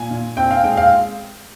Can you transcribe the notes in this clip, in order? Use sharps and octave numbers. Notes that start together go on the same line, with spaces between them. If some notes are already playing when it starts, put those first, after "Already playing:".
Already playing: A#2 G#5
A#2
C4 G5
F5
G#3 G5
F5